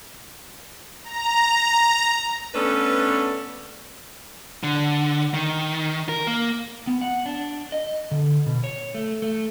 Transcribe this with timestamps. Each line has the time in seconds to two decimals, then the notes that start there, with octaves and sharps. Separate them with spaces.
1.04 A#5
2.54 A3 B3 C#4 D4 A4 B4
4.63 D3
5.34 D#3
6.09 A#4
6.27 A#3
6.87 B3
7.01 F#5
7.26 D4
7.72 D#5
8.11 D3
8.46 B2
8.64 C#5
8.94 A3
9.22 A3